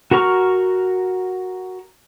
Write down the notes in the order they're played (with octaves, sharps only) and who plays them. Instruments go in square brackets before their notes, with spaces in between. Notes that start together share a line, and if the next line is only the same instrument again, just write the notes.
[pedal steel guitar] F#4 A#4 A#5 C#6 F6